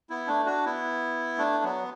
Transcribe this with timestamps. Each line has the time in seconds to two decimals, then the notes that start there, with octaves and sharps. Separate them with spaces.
0.10 B3 E4
0.27 A3 D4
0.46 D4 F#4
0.65 B3 E4
1.38 A3 D4
1.64 F#3 B3